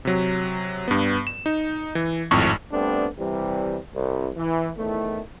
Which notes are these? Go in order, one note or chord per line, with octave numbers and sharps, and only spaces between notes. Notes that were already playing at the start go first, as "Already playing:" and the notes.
C3 F#3
G2 B3
E7
D#4
E3
G#1 F2 A2 C#6
G3 A3 B3 C4 D4
C3 E3 G3
C2
E3
E2 A2 D#3 A3